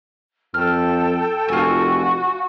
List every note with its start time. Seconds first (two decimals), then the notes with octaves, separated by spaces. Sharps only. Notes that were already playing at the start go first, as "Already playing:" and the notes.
0.54 F2 A4 G5 F6
1.49 F1 F4 F#4 G#5